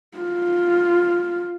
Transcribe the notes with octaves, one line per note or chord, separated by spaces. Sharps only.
F4